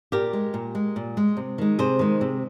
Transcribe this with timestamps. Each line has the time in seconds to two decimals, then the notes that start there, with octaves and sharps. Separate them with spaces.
0.12 A#2 G4 A#4
0.33 G#3
0.54 A#2
0.75 G#3
0.96 A#2
1.17 G#3
1.37 C3
1.58 D#3 G#3
1.79 C3 G#4 C5
1.99 D#3 G#3
2.21 C3